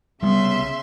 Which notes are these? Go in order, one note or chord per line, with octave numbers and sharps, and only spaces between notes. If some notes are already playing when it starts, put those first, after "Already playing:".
C2 C#3 G3 B3 E5 C6